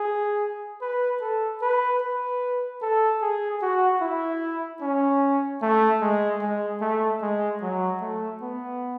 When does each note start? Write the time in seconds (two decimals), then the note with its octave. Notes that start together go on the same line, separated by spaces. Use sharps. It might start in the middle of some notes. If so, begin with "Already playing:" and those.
Already playing: G#4
0.81 B4
1.21 A4
1.62 B4
2.01 B4
2.81 A4
3.21 G#4
3.62 F#4
4.01 E4
4.81 C#4
5.62 A3
6.01 G#3
6.42 G#3
6.81 A3
7.22 G#3
7.62 F#3
8.01 A3
8.42 B3